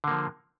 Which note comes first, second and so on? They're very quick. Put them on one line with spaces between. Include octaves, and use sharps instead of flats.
D3 A#3 F3